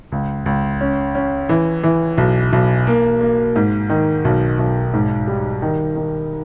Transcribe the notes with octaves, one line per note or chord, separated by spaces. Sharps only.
C#2
C#2
C#4
C#4
E3
E3
B1
B1
A#3
A#3
G#2
D#3
B1
B1
G#2
G3
D#3
D#3